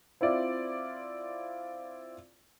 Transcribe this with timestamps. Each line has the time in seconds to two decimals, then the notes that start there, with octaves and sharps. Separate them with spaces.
0.21 C4 E4 F4 D5